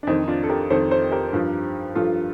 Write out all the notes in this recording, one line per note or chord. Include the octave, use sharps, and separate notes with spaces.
D4
F2 D#3 C4 D#4
D#4
D4 F4
A4
G4 A#4
F2 D#3 A4 C5
A4 C5
G4 A#4
G2 F3
G2 F3 F4 A4